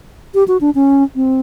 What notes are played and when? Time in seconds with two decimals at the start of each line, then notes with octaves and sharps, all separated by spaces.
0.34 G4
0.48 F#4
0.61 D4
0.75 C#4
1.15 C4